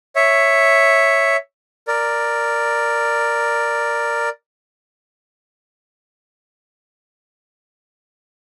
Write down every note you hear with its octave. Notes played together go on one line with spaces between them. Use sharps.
C#5 E5
A#4 D5